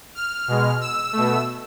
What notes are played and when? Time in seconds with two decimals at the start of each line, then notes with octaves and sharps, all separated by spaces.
0.15 F6
0.48 B2 G#3
0.81 E6
1.13 B2 A3